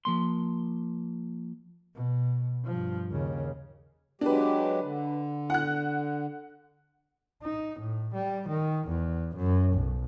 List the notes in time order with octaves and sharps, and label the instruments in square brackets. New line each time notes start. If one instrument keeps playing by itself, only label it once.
[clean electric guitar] F3 A#3 C6
[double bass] B2
G2 F3
D#2 C#3
[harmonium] F#3 G#3 G4 [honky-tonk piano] D4 B4
[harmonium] D3
[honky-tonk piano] F#5 F#6
[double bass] D#4
A2
G3
D#3
E2
F#2
B1